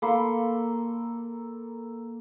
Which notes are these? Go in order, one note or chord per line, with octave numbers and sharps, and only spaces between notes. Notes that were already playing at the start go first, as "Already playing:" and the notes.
A#3 A4 B5 C6